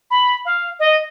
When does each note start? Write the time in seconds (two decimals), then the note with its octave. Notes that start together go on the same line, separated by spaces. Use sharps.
0.10 B5
0.45 F5
0.79 D#5